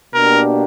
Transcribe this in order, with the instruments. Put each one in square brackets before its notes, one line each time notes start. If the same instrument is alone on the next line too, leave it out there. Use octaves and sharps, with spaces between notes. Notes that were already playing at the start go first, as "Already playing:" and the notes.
[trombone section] B2 A#3 D4 G4 [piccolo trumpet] A#4